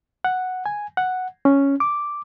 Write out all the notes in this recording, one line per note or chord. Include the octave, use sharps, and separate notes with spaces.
F#5
G#5
F#5
C#4
D6